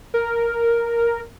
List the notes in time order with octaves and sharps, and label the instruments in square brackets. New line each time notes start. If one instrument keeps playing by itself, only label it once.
[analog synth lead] A#4